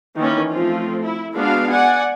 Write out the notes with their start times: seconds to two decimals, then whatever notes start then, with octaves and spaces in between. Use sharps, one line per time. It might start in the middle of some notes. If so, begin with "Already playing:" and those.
0.16 D#3 E3 A#3 C#4
0.51 F3 A3 C4 F4
1.05 E4
1.35 G#3 B3 D4 F#4 F5
1.72 D5 F#5 G#5